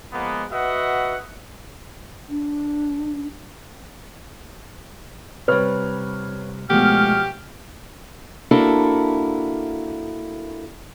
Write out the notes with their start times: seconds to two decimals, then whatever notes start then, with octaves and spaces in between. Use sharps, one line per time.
0.12 F3 G#3 A#3 B3
0.51 F#4 B4 D#5 E5 F#5
2.29 D4
5.48 C3 G3 B4 C#5 F6
6.70 B2 F3 G#3 A3 G4 F5 C#6 F6
8.51 A#3 D4 E4 F#4 A4 A#4